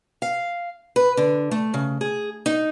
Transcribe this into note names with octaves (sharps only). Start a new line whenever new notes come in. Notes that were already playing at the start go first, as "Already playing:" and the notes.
F5
B4
D3
A3
C#3
G#4
D#4